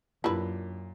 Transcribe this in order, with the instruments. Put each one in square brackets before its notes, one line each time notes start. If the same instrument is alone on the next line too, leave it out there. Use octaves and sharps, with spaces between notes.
[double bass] F#2 [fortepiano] A#2 [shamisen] D4 B4 [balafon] E4 G4 B5